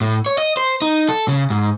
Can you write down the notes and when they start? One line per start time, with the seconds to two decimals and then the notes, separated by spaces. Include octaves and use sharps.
0.01 A2
0.26 C#5
0.38 D#5
0.57 C5
0.82 D#4
1.08 A4
1.28 C#3
1.50 G#2